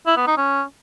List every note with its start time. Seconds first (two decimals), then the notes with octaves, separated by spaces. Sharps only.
0.07 E4
0.17 B3
0.27 D#4
0.37 C#4